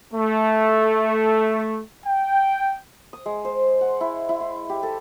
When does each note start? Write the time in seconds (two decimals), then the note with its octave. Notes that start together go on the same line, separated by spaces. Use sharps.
0.13 A3
2.06 G5
3.13 D#6
3.26 G#3
3.45 C5
3.81 F#5
4.01 E4
4.29 E4
4.40 C6
4.69 G4
4.83 A4